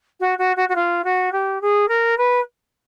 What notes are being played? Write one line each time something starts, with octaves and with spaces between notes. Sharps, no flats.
F#4
F#4
F#4
F#4
F4
F#4
G4
G#4
A#4
B4